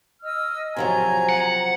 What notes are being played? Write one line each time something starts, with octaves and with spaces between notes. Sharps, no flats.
D#5 E6 F6
C3 F3 F#3 G#5 A#5
F#5